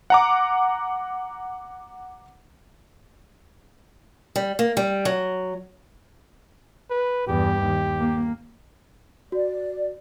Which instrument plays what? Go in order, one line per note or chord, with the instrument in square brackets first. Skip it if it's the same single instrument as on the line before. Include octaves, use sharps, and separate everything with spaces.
[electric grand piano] F#5 A#5 D6
[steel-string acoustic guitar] G3
A#3
G3
F#3
[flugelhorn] B4
[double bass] E2 G2 [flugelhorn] G4
[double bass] D#2
A#3
[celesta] F#4 [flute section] D5